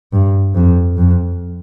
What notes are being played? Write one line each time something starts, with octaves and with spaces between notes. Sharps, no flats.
G2
F2
F2